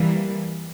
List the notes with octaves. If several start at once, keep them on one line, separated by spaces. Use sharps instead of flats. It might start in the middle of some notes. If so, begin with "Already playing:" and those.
Already playing: E3 G3 A#3